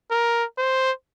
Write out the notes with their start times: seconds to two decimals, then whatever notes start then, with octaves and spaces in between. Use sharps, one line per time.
0.11 A#4
0.58 C5